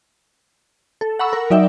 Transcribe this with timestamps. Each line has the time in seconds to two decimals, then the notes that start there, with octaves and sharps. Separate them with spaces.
1.01 A4
1.19 F#5 A#5 B5 C#6 E6
1.33 A#4
1.50 F#3 D#4 D5 E5 G5